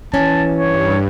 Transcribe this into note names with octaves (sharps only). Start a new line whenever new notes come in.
E3 C#4 A5
G2 C#5